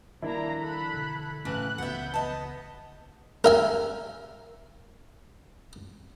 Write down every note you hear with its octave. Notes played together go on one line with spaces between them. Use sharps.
D#3 F3 G3 A#3 D4 E4 A#5
A4 B5 F#6
E1 D3
A2 C#3 E3 F#6
C#2 E3 B3 E5 F#5 G6
B3 D#5 A5
A#4 E5 G#5